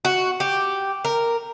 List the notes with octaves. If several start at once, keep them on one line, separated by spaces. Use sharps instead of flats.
F#4
G4
A#4